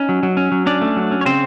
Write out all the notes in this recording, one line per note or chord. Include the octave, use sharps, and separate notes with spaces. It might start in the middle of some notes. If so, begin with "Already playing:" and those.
Already playing: C#4 D#4
F#3
F#3
C#4
F#3
C#4 D4 D5
A3
F#3
C#4
C#5
C#3 C4 C5